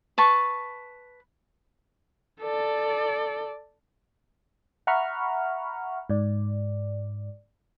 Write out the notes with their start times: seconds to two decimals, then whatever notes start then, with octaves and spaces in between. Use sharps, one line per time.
0.18 B4 A5 C#6
2.41 A4 D5
4.87 E5 F#5 A#5 B5 C#6 F6
6.10 G#2 D5